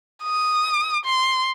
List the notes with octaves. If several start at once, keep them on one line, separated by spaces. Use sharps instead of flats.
D#6
C6